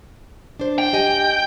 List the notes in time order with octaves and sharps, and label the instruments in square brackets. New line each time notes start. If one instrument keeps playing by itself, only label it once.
[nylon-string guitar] D4 C5
[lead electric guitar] G5
[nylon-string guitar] G4 D#5 G#5